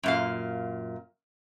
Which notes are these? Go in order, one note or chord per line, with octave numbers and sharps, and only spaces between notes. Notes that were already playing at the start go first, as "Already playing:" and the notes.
F#2 A#2 F5